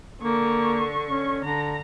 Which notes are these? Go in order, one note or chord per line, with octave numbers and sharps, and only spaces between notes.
D3 A#3 C#6
C#4
D3 A#5